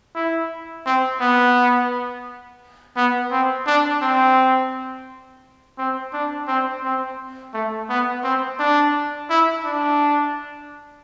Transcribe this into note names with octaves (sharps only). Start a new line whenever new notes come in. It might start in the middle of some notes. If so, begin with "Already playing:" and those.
E4
C4
B3
B3
C4
D4
C4
C4
D4
C4
C4
A3
B3
C4
D4
E4
D4